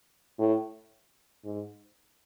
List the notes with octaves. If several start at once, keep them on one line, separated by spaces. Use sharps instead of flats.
A2
G#2